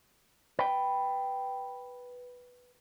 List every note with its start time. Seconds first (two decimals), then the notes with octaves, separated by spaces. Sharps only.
0.59 B4 G5